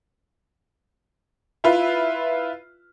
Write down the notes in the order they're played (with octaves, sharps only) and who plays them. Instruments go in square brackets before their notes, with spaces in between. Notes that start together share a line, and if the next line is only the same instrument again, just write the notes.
[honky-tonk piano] E4 F4 B4